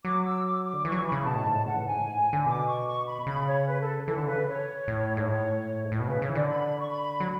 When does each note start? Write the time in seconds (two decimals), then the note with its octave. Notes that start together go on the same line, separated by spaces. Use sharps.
0.05 F#3 D6
0.25 E6
0.45 D6
0.64 D6
0.73 D3
0.85 E3 C#6
0.92 F#3
0.98 E3
1.06 B5
1.12 C#3
1.19 B5
1.25 B2 A5
1.35 A2
1.46 G#2
1.55 A2
1.65 C#3 F#5
1.76 E3
1.85 G#2 G#5
1.96 A2
2.06 G#2
2.19 A2
2.33 D3
2.46 B2 D6
2.67 C#6
2.86 C#6
3.06 B5
3.26 C#3 B5
3.47 C#5
3.67 B4
3.80 A4
4.07 E3 A4
4.17 D3
4.27 C#3 B4
4.48 C#5
4.88 A2
5.17 G#2
5.28 A2 C#5
5.84 G#2
5.92 A2
6.00 B2
6.08 C#3 B4
6.22 C#3 C#5
6.29 E3
6.35 D3 D5
6.48 B5
6.80 C#6
6.88 B5
7.20 F#3